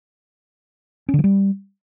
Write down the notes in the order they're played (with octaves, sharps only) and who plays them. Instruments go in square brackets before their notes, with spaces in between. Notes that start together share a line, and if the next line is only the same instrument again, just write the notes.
[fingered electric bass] C#4
D3
F3
G3